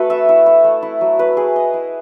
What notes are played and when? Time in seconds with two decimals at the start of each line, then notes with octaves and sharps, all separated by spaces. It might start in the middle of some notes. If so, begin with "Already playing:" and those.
Already playing: A3 F#4 A4 B4
0.10 E5
0.29 E4
0.46 E4
0.64 A3
0.83 E4
1.01 F#3
1.19 B4
1.37 G#4
1.56 D#5
1.74 E4